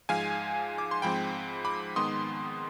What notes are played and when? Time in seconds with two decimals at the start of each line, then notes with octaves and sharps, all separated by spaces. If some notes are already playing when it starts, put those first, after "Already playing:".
0.09 G#2 F3 G#3 F5 G#5
0.78 D6
0.91 C6
1.02 G#2 F3 G#3 C4 G5 B5
1.65 B5 D6
1.96 G#2 D#3 G#3 B3 C6 D#6